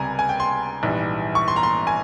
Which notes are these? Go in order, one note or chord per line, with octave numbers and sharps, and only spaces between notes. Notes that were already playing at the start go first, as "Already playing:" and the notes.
Already playing: C#2 C3 G3 G#5 A#5
G#5
G5
C6
A#1 G#2 E3 G3
C#6
C6
A#5
C6
G#5